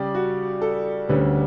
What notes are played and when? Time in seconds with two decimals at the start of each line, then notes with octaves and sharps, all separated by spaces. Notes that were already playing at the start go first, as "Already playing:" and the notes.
Already playing: C#3 G3 G4 D5
0.14 F#4
0.61 A4
1.09 D2 D3 G3 C#4 B4